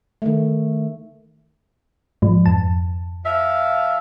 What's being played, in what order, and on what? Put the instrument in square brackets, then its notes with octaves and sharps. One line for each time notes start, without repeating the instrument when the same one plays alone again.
[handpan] D#3 A3
[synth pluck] G#2 F3
F2 A5
[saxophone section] F3 E5 F5